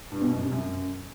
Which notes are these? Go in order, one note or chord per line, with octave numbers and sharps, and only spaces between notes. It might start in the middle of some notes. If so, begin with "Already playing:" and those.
G2
B2
F#2
C3
F#2